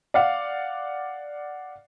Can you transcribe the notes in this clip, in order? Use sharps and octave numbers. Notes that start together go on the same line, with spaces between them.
D5 F5 F#5